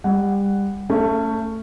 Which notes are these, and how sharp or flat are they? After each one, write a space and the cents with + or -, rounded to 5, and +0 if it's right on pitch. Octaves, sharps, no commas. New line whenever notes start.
G3 +25 F#5 +0
A3 +20 C#4 +0